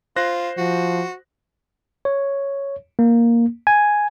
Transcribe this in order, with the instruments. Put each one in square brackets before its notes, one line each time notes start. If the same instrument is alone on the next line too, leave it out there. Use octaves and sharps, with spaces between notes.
[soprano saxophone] F4 [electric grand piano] C5 F#6 A#6
[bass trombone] F3 [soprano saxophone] F#4
[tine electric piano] C#5
A#3
G#5